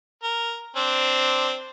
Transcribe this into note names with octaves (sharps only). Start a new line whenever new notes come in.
A#4
C4 D4